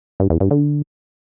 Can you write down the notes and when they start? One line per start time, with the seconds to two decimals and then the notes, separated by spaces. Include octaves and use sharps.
0.20 G2
0.30 E2
0.40 G2
0.51 D3